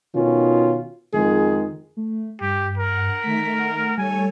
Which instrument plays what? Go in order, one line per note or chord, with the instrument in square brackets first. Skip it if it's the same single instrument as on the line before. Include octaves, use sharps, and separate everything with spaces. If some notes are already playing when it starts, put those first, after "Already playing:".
[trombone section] B2 D#3 C#4 F4
F2 D#3 G#3 G#4
[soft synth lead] A3
[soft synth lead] G2 [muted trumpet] G4
[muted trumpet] A#4 [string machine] F#5
[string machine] D#3 A3 [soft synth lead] B6
[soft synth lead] F#5
[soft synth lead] G3 [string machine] A4 C#5 [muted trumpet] G#5